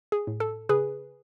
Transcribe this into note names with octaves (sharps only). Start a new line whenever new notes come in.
G#4
A2
A4
C#3 G#4 B4